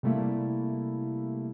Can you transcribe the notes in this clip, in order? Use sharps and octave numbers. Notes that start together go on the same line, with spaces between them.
C3 G3 A3 A#3 E4